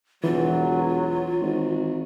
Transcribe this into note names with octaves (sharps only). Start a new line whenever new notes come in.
E1 E3 F#3 F4
G#1